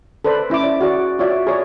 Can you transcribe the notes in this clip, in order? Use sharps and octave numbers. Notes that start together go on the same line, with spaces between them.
A4 B4 C5 D5 B5
C#4 E4 E5 D6
D5
F#4 G#4 D5
F4 F#4 C#5 D5 E5
G#4 C#5 D5